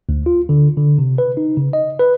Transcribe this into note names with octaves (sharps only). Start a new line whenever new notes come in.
D2
F4
D3
D3
C3
B4
D#4
C#3
D#5
B4